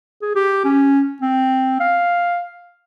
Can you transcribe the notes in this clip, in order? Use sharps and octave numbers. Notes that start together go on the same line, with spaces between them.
G#4
G4
C#4
C4
F5